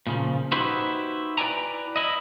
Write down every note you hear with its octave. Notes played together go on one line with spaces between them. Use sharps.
A#2 C#3 F3
D#4 E4 F#4 G4 B4 C5
E4 B4 D5 G5 G#5 A#5
E4 D#5